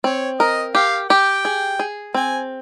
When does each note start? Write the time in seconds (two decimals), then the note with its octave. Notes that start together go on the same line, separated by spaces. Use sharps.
0.04 C4 C#5
0.40 A#4 D#5
0.75 G4 F5
1.10 G4 G5
1.45 G#4
1.79 G#4
2.14 C4 G#5